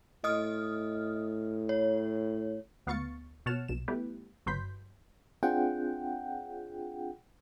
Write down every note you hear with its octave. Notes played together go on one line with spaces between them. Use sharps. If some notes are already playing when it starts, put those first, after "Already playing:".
A2 D#5 D#6 F6
C#5
D2 B3 F5 C#6 A6 C#7
B2 C#5 F#5 A5 F6 E7
B1 B2 E7
G3 A3 B3 E4 G4 B4
G1 F#3 B4 C6 G6 B6
C4 D4 F4 G#4 F#5 G5